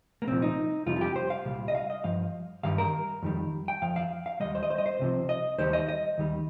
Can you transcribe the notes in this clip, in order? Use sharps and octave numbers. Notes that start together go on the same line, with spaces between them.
A#3
C2 A#2 F3 C4
D#4
F2 C3 G3 F4
F4
G4
C5
F5
C2 A#2 G3
D#5
F5
D#5
G2 F3 F5
G2 D#3 G3 F5
A#4
F2 D#3 G3
G5
F2 F3 F5
F5
F5
D#2 D#3 G3 D#5
C5
D#5
C5
D#5
C5
C2 C3 F3
D#5
D#2 D#3 G3 C5
D#5
D#5
D#2 D#3 G3